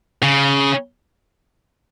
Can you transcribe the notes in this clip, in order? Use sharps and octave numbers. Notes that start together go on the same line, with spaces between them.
C#3